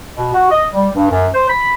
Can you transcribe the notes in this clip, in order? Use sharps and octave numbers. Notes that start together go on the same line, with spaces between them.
B2
F#4
D#5
G3
G2
F#2
C5
B5